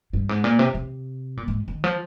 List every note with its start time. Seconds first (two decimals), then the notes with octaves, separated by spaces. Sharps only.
0.13 G2
0.29 G#2
0.44 A#2
0.59 C3
0.75 C3
1.37 A#2
1.48 G#2
1.68 D#3
1.84 F3